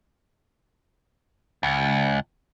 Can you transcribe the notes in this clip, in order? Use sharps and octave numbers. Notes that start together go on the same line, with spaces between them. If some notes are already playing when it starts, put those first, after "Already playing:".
C#2